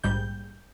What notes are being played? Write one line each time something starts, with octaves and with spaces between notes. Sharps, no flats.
A#1 G#2 G3 G6